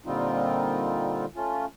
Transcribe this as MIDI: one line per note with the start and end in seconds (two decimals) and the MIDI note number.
0.06 1.25 46
0.06 1.25 50
0.06 1.25 55
0.06 1.25 60
0.06 1.25 63
0.06 1.25 65
1.36 1.66 57
1.36 1.66 61
1.36 1.66 65